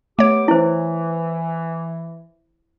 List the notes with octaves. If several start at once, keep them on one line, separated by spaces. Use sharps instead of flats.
A3 B3 G4 C#5 D6
E3 E4 C5